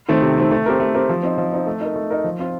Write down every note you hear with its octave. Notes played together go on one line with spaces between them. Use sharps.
D#3 A3 C4
C3
D#3 A3 C4
A3
C4 G4 A#4
A3
C4 G4 A#4
F3
C4 D#4
F3
C4 D#4
A3
D#4 A#4
A3
D#4 A#4
F3
C4 F4